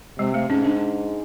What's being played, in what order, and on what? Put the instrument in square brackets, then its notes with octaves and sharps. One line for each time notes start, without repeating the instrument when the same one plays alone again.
[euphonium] C3 [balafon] G#3
[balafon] A3
[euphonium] G#2 [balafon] C#4
[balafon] D4